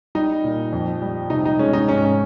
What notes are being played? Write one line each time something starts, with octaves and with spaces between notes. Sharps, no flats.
G3 D#4
A#2
F2
G3
C3 D#4
D#4
G#3 C#4
D#4
G#2 C#4
C#4